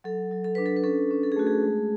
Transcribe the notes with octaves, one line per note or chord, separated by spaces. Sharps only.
F#3 A4
F#3
A4
D4 B4
A4
B4
C#4 A4
C#4
A4
G#4
A3 F#4
G#4
G#3